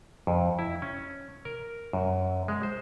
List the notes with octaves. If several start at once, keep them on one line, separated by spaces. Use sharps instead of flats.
F2
E4
C#4
A#4
F#2
G#3
C5